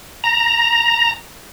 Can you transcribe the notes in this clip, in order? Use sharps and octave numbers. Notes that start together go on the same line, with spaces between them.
A#5